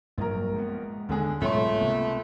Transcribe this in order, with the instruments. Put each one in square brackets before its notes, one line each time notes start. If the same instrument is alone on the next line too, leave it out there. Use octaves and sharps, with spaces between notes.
[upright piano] A#1 A#4 [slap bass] G2 F#3
[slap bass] G#3 A3 B3
[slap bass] D#2 [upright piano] D3 G#3 G#4
[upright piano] C#2 C#5 C6 [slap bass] G#2 B2 F#3 [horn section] A3
[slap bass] C3 A#3 B3